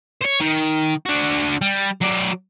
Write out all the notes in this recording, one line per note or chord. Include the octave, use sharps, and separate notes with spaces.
C5 C#5
D#3
D4 F#4
G3
F#3 D5